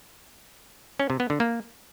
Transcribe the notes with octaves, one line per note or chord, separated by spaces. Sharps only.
C#4
C3
B3
D3
A#3